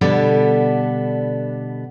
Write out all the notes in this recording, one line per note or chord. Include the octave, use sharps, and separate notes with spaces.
B2 D3 G3 B3 D4 A4